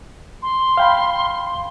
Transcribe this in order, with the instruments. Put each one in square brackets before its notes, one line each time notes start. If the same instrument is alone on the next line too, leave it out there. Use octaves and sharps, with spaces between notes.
[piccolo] C6
[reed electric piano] F5 G5 B5